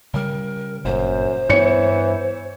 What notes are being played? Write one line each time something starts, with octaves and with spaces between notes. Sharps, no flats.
C#3 G3 A#4
G1 F#2 A#2 C5
G2 E3 B3 C#5 C#7